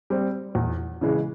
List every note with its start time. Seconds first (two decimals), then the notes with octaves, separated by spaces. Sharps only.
0.10 G3 C4
0.55 E2
1.01 C#3 E3 G#3